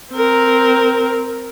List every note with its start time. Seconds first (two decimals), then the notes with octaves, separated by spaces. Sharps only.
0.14 C4 A#4